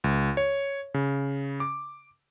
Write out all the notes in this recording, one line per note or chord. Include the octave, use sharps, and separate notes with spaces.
C#2
C#5
C#3
D6